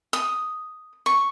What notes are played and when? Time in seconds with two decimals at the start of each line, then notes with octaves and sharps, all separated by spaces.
0.13 D#6
1.06 C#6